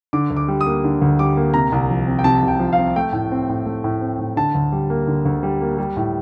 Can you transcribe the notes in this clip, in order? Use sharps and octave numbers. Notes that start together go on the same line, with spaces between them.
D3 D6
D2
D6
G3
D#6
A#3
D3
D2
G3 D6
A#3
C3 A#5
C2
F3
C4
G5
C3 A5
C2
G5
F3
F5
C4
A3 G5
A2
C4
A2
A3
A2
C4
A2
D3 A5
D2
G3
A#3
D3
D2
G3
A#3
G3
A2